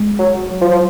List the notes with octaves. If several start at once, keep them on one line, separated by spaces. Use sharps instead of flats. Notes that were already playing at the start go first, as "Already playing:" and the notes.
Already playing: G#3
F#3
F#3
F3
F3